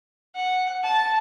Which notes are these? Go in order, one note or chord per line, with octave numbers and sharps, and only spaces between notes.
F#5
A5